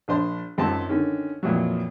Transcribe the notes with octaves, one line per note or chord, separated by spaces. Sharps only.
A#1 D4 C5
G#1 F#2 C4 F4 A5
D3 D#3 C#4
F2 A#2 E3 F#3